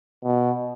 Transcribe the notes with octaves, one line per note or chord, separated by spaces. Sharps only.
B2